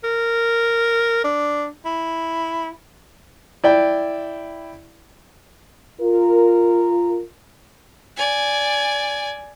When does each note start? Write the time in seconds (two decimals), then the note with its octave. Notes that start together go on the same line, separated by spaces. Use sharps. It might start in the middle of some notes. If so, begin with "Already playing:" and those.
0.04 A#4
1.24 D4
1.85 E4
3.64 E4 D5 G5
6.02 F4 A#4
8.16 D5 G#5